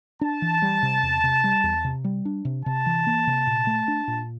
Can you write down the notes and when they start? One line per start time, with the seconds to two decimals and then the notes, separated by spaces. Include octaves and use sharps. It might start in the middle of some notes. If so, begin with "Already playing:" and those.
0.21 D4 A5
0.42 E3
0.62 G3
0.83 C3
1.03 E2
1.24 C3
1.44 G3
1.64 E2
1.84 C3
2.04 G3
2.25 D4
2.45 C3
2.65 C3 A5
2.86 E3
3.07 A#3
3.27 C3
3.47 A#2
3.67 A3
3.88 D4
4.08 A#2